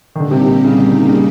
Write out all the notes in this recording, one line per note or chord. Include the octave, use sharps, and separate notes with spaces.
D#3
A#2 D3 G3 A#3 D#4 G4
C3
C3
C#3
C#3